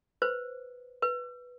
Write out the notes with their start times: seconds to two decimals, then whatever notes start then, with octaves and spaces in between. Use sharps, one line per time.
0.22 B4 C5
1.02 B4